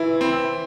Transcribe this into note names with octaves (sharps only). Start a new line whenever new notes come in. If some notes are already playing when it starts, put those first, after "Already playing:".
Already playing: E3 E4
C4